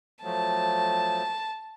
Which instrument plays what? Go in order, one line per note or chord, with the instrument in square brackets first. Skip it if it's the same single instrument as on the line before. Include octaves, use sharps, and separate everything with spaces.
[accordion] F3 F#3 A3 [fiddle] A5